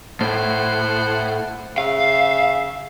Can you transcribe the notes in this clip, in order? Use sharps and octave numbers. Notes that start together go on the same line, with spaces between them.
A2 C5 F#5
C#3 E5 F5